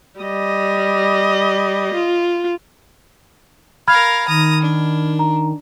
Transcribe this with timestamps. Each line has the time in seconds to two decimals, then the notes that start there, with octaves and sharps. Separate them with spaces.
0.20 G3 D#5
1.94 F4
3.88 A#4 F5 B5 F6 G#6
4.28 D#3 A#5 D#6
4.61 D4
5.19 A#5